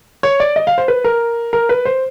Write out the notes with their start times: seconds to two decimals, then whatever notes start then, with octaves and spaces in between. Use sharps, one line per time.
0.23 C#5
0.40 D5
0.56 D#5
0.67 F5
0.78 C5
0.88 B4
1.04 A#4
1.53 A#4
1.69 B4
1.85 C5